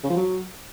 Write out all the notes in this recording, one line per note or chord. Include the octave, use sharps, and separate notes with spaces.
C#3
F3
F#3